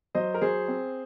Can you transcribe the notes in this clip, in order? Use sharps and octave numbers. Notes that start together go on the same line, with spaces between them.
F#3 C5 D#5
A#4
F#3 G#4 C5
C4